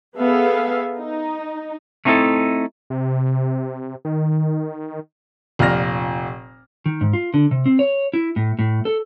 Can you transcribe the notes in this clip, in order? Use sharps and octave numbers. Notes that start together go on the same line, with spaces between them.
B3 G#4 A4 E5 F5
D#4
A3 C4 D#4 E4 F#4 A4
C3
D#3
F1 A#2 D5 F6 A#6
D#3
G#2
F4
D3
C3
C4
C#5
E4
A2
A2
A4